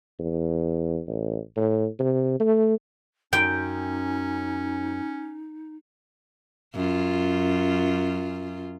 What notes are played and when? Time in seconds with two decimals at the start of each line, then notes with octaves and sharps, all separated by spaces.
0.19 E2
1.08 A1
1.56 A2
2.00 C3
2.40 A3
3.33 F#2 C#4 D#4 G5
6.75 F#2 F4